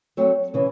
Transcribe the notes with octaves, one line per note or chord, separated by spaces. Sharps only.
F#3 A3 C4
C#3 E3